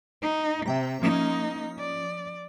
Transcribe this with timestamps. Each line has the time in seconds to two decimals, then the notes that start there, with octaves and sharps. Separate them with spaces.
0.22 D#4
0.66 C3 E5 G5 A#5
1.02 F3 A#3 C#4 D#4 D#6
1.79 D5